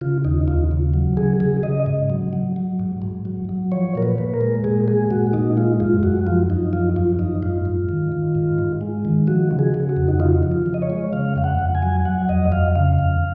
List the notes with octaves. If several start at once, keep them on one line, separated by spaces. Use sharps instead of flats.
C#3 F4
D#2 D#4
D#2 F4
C#3
F#3
C#3 G#4
C#3 G#4
C#3 D#5
G#2
F#3
F#3
F#3
G#2
G#2
F#3
F#3
F3 C#5
A#2 A#4
B4
A#2
A#4
G#3
A#2 G#4
G#3 G#4
A#2 F#4
A#2 D#4
G#3 F4
F#2 F4
F#2 F#4
F3 F4
F#2 D#4
F3 F4
F#2 F4
F#2 D#4
G#2 F4
G#2
D#3
D#3
G#2
G#2
G#3
D#3
F3 F#4
C#3
G#4
C#3
F#4
F2
D#4
C#3 F4
F3
F4
F3
D#5
C#5
G#3
C#3 F5
F2 F5
F#5
F2
G#5
F#3
F#3 F#5
F2 D#5
F2 F5
C#3 F5
F2